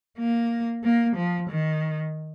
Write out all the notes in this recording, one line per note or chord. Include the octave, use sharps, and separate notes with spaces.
A#3
A#3
F3
D#3